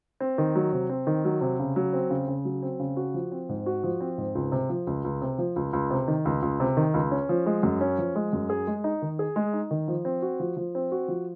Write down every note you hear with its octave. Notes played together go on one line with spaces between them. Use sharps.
C4
D#3
F#3
C3
C4
D#3
F#3
C3
C#3
F#3
C4
C#3
C#3
F#3
C4
C#3
F#4
F3
C4
G#2
F#4
F3
C4
G#2
C#2
C3
F3
C#2
C#2
C3
F3
C#2
C#2
C3
D#3
C#2
C#2
C3
D#3
C#2
C#4
F3
G#3
F#2
C#4
F3
G#3
F#2
G#4
G#3
D#4
D#3
G#4
G#3
D#4
D#3
F3
C4
F#4
F3
F3
C4
F#4
F3